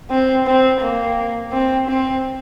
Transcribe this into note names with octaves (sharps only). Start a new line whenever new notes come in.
C4
C4
A#3
C4
C4